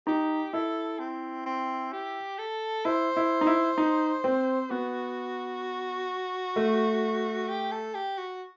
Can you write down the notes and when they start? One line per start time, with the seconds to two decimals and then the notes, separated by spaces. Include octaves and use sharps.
0.07 D#4 G4
0.53 E4 A4
0.99 C4
1.46 C4
1.92 G4
2.39 A4
2.85 E4 C5
3.17 E4
3.41 D#4
3.47 E4
3.78 D#4
4.24 C4
4.70 B3 F#4
6.56 A3
7.48 G4
7.72 A4
7.95 G4
8.18 F#4